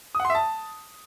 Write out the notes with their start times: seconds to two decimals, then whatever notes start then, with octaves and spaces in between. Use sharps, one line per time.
0.15 D#6
0.20 F#5
0.25 C6
0.30 E5
0.35 A5